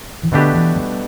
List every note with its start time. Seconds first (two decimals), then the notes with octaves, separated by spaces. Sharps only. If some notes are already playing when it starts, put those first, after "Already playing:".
0.23 E3
0.32 B2 D3 A3 D4 G4 B4
0.54 E3
0.76 G3